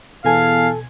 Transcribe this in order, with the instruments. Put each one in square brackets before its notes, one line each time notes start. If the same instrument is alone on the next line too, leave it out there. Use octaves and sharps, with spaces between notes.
[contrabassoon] E2 [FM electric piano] B2 G#5 [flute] A4 [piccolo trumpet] F5